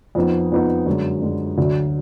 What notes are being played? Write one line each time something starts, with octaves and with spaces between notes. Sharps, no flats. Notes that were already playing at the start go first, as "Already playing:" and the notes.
F2 F3 B3 D#4
F2 F3 B3 D#4
F#2 D3 G#3
F#2 D3 G#3
D2 D3 F#3